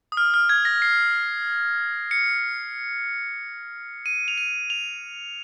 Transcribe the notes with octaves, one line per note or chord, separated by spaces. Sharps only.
D#6
F6
F6
G#6
A#6
C7
C#7
D#7
F7
D#7
F7